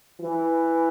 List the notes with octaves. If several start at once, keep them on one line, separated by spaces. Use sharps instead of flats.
E3